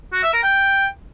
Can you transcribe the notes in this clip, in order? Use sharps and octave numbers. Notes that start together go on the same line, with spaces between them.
F#4
E5
A#4
G5